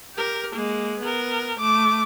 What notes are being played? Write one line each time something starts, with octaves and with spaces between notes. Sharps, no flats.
G4 A#4
G#3 A#3
B3 A#4
A3 D6